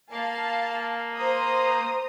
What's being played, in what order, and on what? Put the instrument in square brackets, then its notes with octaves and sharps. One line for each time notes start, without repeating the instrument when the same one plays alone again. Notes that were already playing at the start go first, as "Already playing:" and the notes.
[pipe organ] A#3 [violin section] F5 A5
[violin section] C5 A#5 D#6